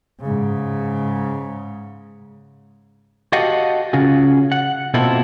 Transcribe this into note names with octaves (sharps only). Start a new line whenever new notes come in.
G#2 C#3
F#4 G4 A4 D#5 F5 F#5
C#3 F4 F#4 G#4
F#5
B2 A#3 C4 E4 F4 A4